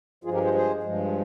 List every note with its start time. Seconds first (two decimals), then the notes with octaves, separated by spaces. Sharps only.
0.24 G2 F3 G#3 F4 G#4
0.34 G4 A#4
0.44 G#4 C5
0.54 G#4 C5
0.83 G2 F3 G#3